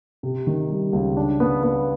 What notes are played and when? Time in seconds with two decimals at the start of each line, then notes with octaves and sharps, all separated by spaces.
0.23 C3
0.47 D#3
0.70 G3
0.93 C#2
1.17 D4
1.40 B3
1.63 B3